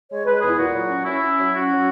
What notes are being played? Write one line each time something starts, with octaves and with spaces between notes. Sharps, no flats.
G#3 C#5
G#3 B4
E2 G#4
E4
A#2 F#4
F#3
C#4
C#4 E4
C#4
F#3
C#4 F#4
F#3